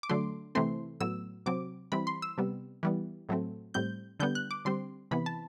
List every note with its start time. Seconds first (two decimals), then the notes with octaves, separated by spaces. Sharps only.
0.03 D6
0.09 D3 F#3 A3 C6
0.55 C3 E3 A3 C4 C6
1.00 A2 F#3 B3 E6
1.46 C3 F#3 C4 D6
1.92 E3 G3 C4 B5
2.07 C6
2.22 E6
2.38 C3 G3 B3
2.83 E3 G3 B3
3.29 A2 F#3 A3 C4
3.74 A2 G3 C4 G6
4.20 D3 G3 B3 G6
4.35 F#6
4.51 D6
4.65 D3 G3 C4 C6
5.11 C3 E3 B3 B5
5.26 A5